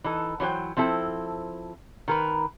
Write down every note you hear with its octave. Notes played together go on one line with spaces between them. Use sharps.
E3 D#4 A4
E3 F#3 E4 C5 G5
F3 C4 E4 A4
D#3 A#4 B4